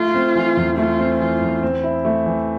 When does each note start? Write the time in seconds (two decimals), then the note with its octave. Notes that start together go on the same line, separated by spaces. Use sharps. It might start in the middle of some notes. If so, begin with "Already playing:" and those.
Already playing: A3 F4
0.14 C4
0.36 E3
0.57 E2
0.77 A3 F4
0.99 C4
1.20 E3 F4
1.41 E2
1.63 C4
1.83 E4
2.05 A3
2.26 E3